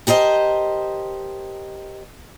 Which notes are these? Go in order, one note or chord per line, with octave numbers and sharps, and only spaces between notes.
G4 A#4 C5 D#5 A5